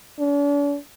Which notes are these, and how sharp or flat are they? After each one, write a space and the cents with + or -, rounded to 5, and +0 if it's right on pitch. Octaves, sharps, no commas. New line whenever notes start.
D4 -45